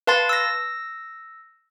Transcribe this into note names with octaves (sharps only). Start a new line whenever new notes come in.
B4 F5 A5 C6 A6
E6 A#6